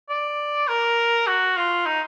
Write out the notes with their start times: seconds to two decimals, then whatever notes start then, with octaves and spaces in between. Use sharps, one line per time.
0.09 D5
0.68 A#4
1.27 F#4
1.56 F4
1.85 D#4